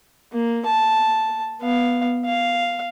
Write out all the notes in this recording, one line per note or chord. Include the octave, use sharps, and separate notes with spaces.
A#3
A5
B3 F5
F5